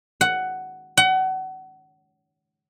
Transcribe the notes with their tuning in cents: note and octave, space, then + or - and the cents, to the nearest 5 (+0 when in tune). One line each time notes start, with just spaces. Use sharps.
F#5 +10
F#5 +30